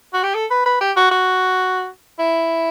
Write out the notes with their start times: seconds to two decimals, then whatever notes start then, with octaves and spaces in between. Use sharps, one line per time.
0.14 F#4
0.23 G4
0.35 A4
0.50 B4
0.66 B4
0.81 G4
0.97 F#4
1.11 F#4
2.19 E4